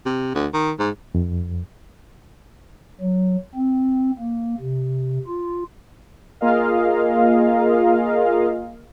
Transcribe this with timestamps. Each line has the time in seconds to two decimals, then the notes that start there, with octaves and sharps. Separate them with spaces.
0.06 C3
0.35 D2
0.54 D#3
0.79 G#2
1.15 F2
3.01 F#3
3.55 C4
4.19 A#3
4.60 C3
5.27 F4
6.41 A#3 F4 G#4 A#4 D#5 F5